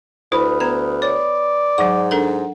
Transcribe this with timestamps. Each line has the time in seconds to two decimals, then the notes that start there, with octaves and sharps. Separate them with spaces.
0.32 D2 E4 B4 C5 B5 D#6
0.60 B3 A#5
1.02 C#5 D5
1.78 G#2 F#3 F#5 C#6
2.11 D4 A4 A#4